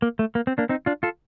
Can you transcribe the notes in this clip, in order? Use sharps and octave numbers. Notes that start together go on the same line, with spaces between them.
A#3
A3
A#3
C4
A#3 D4
C4 D#4
D4 F4
F4 A4